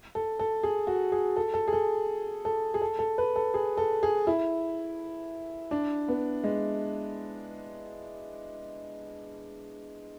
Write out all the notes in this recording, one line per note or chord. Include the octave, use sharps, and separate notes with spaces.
A4
A4
G#4
F#4
G#4
A4
A4
G#4
A4
A4
G#4
A4
A4
B4
A4
G#4
A4
G#4
E4
D4
B3
G#3